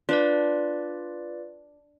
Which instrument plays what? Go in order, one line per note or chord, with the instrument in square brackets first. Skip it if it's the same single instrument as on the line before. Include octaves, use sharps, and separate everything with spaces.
[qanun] D4 [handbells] F4 B4 D5